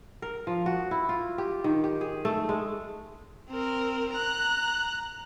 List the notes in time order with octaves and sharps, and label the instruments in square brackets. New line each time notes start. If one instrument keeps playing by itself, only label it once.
[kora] A#4
F3
F#4
E4
F4
G4
D#3
G4
G#4
A3
G#3
[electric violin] C4 A#4
A#5 F#6